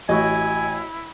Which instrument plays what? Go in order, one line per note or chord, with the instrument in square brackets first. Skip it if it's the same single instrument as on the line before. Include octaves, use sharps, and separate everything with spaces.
[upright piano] A1 [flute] E4 [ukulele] F#4 D#5 [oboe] G#5